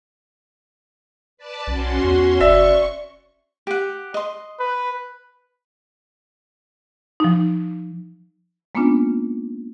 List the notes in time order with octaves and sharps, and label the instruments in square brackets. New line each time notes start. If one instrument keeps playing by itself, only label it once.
[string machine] B4 D5 A5
[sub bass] B1 [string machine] C#4 F#4 C6
[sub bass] E2
[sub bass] F#1 [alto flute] D5 [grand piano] E5 [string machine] C#6
[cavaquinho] G4 F#5
D#5 C6
[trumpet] B4
[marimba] F3 D#4
G#3 A#3 B3 C#4 D4 F4